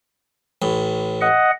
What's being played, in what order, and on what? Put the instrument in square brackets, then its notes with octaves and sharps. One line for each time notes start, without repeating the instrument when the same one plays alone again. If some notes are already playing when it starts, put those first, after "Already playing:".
[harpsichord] A1 A2
[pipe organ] D#5 F#5